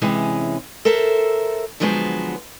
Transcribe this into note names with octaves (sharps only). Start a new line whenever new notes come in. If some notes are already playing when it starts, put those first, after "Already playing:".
C3 E3 G#3 C#4
A4 A#4 C5 E5
D3 F3 F#3 G#3 B3 C5